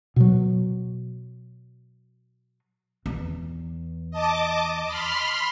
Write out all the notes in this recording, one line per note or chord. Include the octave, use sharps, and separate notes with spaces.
B2 F#3
E2
D#5 A5 D6
B5 C6 F6